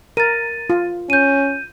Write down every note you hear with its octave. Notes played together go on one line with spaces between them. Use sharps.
A#4 A6 D#7
F4
C#4 G6 D#7